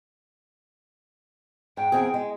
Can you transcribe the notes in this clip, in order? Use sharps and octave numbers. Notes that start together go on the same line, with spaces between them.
G#2 G5
E2 C4 G#4
G#3